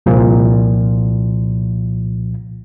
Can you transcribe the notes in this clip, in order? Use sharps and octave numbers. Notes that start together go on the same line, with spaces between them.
C2 A#2 F3